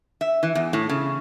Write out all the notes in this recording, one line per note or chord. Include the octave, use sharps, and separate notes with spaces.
E5
E3
E2
A2
C#3